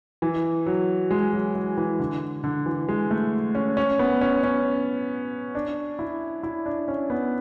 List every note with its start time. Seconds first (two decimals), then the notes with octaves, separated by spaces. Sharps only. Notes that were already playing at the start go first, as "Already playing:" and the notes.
0.22 E3
0.67 F#3
1.11 G#3
1.33 F#3
1.55 G#3
1.78 E3
2.00 D3
2.44 D3
2.66 E3
2.89 G#3
3.11 A3
3.55 C#4
3.77 C#4
3.99 B3
4.21 C#4
4.44 C#4
5.55 D4
5.99 E4
6.43 E4
6.66 D4
6.88 C#4
7.10 B3